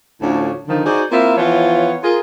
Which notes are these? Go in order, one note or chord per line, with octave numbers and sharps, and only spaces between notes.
D2 A2 F3 C#4 D4 C#5
D3 D#3 F3
D#4 F#4 G#4 C5 D5
A#3 C4 E4 F4 A#4 E5
E3 F3 B3 F4 C#5
F4 G#4 A#4